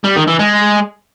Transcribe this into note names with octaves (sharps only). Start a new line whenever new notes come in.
G3
D#3
E3
G#3